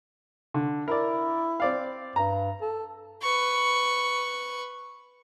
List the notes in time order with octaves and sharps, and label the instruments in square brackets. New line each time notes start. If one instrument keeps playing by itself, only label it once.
[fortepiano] D3
[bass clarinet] E4 [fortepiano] A#4 D5
[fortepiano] C4 D5 F5
[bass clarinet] G2 [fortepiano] A#5
[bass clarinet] A4
[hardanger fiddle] B4 C#6